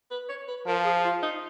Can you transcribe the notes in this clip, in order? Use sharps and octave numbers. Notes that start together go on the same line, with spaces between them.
B4
C#5
B4
F3 A#4
G#4
F4
D#4